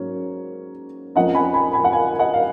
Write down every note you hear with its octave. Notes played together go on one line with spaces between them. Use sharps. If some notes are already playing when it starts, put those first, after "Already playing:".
Already playing: G#2 F#3 A#3 C#4 C#5
F2 F3 A#3 C#4 D#5 F#5
G#5 B5
G#5 B5
G#5 B5
F#5
F5 G#5
D#5 F#5
F5